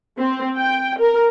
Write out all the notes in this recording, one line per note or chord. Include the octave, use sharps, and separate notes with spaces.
C4
G5
A#4